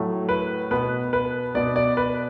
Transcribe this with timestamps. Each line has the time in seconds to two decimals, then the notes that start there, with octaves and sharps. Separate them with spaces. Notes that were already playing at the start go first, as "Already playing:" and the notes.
Already playing: A2 F#3 A3
0.29 B4
0.71 B2 B3 B4
1.13 B4
1.55 B2 B3 D5
1.76 D5
1.97 B4